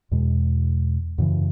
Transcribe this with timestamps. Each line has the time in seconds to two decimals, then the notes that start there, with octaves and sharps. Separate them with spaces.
0.11 E2 B2 G#3
1.18 F#2 C#3 E3